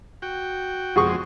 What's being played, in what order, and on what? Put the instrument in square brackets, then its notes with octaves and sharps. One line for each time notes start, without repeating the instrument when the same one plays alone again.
[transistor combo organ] F#4 G5
[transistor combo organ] F2 G#3 C4 [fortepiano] F#4 G#4 C#6